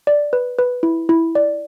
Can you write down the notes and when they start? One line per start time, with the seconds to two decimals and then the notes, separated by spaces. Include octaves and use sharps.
0.07 D5
0.33 B4
0.58 B4
0.83 E4
1.09 E4
1.35 D5